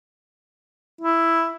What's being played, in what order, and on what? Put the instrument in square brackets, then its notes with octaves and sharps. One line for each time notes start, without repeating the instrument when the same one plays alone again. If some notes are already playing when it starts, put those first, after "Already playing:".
[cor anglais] E4